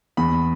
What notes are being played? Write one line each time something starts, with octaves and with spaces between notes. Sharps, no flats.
E2 B5